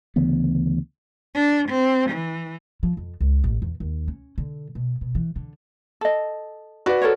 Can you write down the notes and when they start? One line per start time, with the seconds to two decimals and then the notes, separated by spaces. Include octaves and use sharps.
0.16 D2 C#3 E3 B3
1.35 D4
1.69 C4
2.10 E3
2.83 F3
2.97 F2
3.21 C#2
3.44 A1
3.62 E2
3.80 D#2
4.08 C#4
4.38 D3
4.75 B2
5.01 B2
5.15 E3
5.36 D3
6.01 A4 D#5
6.86 F#4 B4 D5
7.02 A4 A#4 C#5